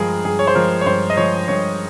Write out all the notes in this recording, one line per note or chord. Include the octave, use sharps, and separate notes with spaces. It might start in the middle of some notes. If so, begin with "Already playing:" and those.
Already playing: G2 F3 G#3 G#4 A#4
G2 G#4
C#5
C5
F3 G#3 A#4
C#5
G2 C5
D#5
F3 G#3 C#5
G2 C#5